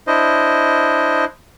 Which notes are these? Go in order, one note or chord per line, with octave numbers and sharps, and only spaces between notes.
D4 E4 C5 D#5